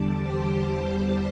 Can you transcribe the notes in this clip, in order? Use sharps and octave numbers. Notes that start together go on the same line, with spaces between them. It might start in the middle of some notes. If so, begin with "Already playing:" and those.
Already playing: E2 D3 G3 A5 D6
G4 C5